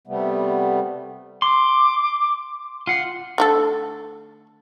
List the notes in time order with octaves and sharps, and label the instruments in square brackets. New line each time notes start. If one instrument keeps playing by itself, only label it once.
[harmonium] C3 G3 A3 B3
[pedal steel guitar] C6 [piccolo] D6
[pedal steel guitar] F4 F#5 [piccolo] C7
[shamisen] D3 A3 A4